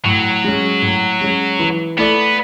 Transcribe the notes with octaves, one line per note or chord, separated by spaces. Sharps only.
A2 F#3
G#3 C#4
A2
G#3 C#4
E3
A3 B3 E4 A4 D5